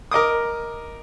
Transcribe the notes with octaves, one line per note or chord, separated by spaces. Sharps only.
A#4 D#5 D6 D#6